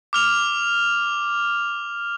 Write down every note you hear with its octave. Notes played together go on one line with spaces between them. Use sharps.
D6 F6 F7